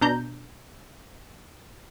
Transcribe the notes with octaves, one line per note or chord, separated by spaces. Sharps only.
B2 D4 A#5 G6